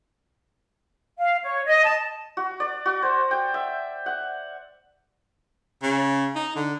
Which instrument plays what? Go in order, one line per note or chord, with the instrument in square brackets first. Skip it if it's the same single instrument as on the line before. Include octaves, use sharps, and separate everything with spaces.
[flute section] F5
C#5
D#5
A5
[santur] F#4
D5
F#4
C5
G5
E5
F#5
[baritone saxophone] C#3
D#4
D3